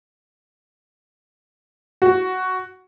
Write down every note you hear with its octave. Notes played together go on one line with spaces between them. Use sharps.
F#4